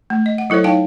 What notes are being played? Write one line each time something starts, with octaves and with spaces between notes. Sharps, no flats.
A3
D#5
F#5
F#3 E4 A4 C5 C#5
D#4 C#5 F5 G5 A5